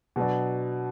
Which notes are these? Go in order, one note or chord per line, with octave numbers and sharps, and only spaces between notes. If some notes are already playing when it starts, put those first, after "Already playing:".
B2 F#3 B3 D4